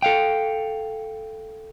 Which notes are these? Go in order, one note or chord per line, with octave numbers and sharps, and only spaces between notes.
A4 F5 G5